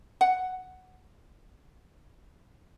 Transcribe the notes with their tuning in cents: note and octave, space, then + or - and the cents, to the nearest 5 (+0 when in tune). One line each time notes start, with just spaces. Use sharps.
F#5 +5